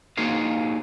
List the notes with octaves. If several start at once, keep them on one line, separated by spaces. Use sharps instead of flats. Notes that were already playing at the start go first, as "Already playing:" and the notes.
A#3 D#4 F#4 G#4 C5 F5